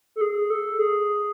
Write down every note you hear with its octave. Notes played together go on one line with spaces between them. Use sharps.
A4
G#4
A4
G#4